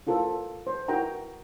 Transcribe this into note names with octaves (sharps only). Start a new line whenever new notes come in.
E4 F4 A4 A#4 C5
C5
E4 F#4 A#4 G5 A#5